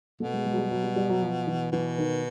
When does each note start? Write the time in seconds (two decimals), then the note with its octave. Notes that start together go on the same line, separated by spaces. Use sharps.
0.20 B2 A3
0.34 G#3
0.46 G#3
0.53 F#3
0.59 G3
0.71 F#3
0.84 G3
0.96 G3
1.09 F#3
1.22 F3
1.47 E3
1.72 B2 E3
1.98 D#3